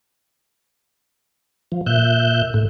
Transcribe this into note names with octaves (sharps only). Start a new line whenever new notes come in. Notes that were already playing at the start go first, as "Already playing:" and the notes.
F3
A#2 E5 F#6 G6
A2